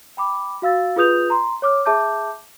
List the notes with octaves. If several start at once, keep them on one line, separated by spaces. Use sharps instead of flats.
G5 B5 D6
F#4 F5 E6 A6
F4 G#4 B4 D#6 G6 F7
A#5 C6
C#5 D6 F6
G#4 E5 A5 D6 G6